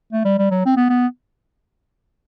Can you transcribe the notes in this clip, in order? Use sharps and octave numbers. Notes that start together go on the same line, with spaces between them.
A3
G3
G3
F#3
C4
B3
B3